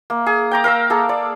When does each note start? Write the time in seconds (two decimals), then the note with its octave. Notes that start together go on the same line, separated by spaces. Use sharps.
0.10 A#3
0.26 G#4
0.51 G5 A#5 D6
0.64 A#4 F5 A#5 E6
0.90 A#3 G#4 A4
1.09 D5